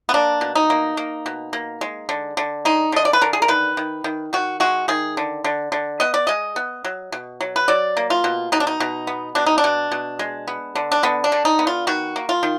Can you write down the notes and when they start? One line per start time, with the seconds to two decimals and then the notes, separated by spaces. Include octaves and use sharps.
0.09 B3
0.14 A#3 D4
0.41 B2
0.55 D#4
0.70 A#3
0.97 A#3
1.26 B2
1.53 A#3
1.81 G#3
2.09 D3
2.37 D3
2.65 G#3 D#4
2.92 D3 D#5
3.05 D5
3.13 B4
3.21 D3 A#4
3.33 G#4
3.42 A#4
3.48 D#3 B4
3.77 D#3
4.04 D#3
4.33 D#3 F#4
4.60 G#3 F#4
4.88 D#3 G#4
5.17 D3
5.44 D3
5.72 D3
6.00 B3 D#5
6.14 D5
6.27 G#3 D#5
6.56 B3
6.84 F#3
7.12 B2
7.41 F#3
7.56 B4
7.68 F#3 D5
7.97 A#3
8.10 F4
8.24 B2
8.52 B2 D#4
8.60 D4
8.67 D#4
8.80 B2
9.07 B3
9.35 B2 D4
9.46 D#4
9.58 D4
9.64 B2
9.92 B2
10.19 G#3
10.48 B3
10.75 D3
10.92 D4
11.03 D3 B3
11.24 D4
11.32 D3
11.45 D#4
11.59 B3
11.67 F4
11.87 D#3 F#4
12.16 A#3
12.29 F4
12.43 D#3